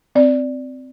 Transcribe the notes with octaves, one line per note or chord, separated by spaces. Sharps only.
C4 D5